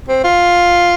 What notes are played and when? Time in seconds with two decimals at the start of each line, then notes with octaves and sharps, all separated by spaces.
0.08 C4
0.24 F4